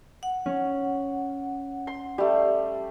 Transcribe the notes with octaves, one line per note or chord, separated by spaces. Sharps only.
F#5
C#4
C6
G3 A3 G4